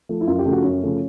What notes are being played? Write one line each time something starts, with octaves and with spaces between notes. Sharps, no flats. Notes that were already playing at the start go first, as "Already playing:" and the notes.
F3 A3
E4
F#2 F4
G4
C#3 F3 A3
F#4
F#2 C#4
C#3 F3 A3